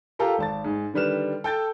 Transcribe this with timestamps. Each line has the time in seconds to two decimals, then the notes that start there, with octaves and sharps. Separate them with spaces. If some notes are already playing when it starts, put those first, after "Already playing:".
0.19 F4 G4 A4 A#4 A#5
0.38 G#1 A5 A6
0.64 G#2
0.94 D3 D#3 G3 B4 F6 E7
1.44 A4 G5 G6 A6